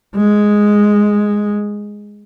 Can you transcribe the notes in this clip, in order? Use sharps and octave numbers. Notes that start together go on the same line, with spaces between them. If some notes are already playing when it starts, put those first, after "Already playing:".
G#3